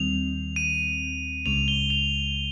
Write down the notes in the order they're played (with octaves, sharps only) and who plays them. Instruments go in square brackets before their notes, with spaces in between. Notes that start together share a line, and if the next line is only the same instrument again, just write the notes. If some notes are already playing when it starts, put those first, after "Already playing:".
Already playing: [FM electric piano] D#2 D#3 G3 C4 [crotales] F7
[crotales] D#7
[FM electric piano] C#2 C#3 G#3 [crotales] F7
[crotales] G7
F7